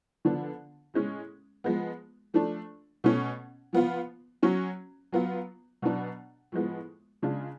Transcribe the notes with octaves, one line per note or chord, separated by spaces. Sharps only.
D3 F3 B3 D4
A2 G#3 C#4
F3 G#3 B3
F3 A3 D4
B2 A3 C#4
F3 B3 F4
F#3 C#4 F#4
F#3 B3 F4
B2 F#3 B3 D4
A2 F3 G#3 B3
C#3 G#3 D4 F4